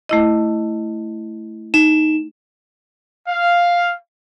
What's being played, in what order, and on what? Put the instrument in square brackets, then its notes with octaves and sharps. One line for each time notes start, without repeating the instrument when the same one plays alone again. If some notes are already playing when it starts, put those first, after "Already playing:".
[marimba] A3 E4 D#5
[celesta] D#4 E7
[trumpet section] F5